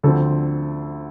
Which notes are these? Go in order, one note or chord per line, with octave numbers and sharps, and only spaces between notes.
D2 D3 F3 C4 A4